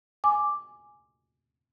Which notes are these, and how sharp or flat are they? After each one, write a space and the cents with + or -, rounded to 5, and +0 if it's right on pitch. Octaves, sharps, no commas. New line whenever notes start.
G#5 +0 D6 +0